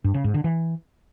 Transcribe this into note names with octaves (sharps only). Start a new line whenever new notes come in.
G2
C#3
G#2
D3
E3